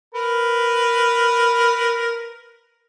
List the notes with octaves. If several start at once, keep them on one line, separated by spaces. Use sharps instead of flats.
A#4 B4